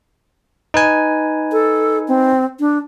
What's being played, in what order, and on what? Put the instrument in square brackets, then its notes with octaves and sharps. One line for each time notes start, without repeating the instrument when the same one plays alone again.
[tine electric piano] D#4 B4 G#5
[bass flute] A4
C4
D4